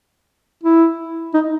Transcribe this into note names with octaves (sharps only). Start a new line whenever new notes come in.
E4
D#4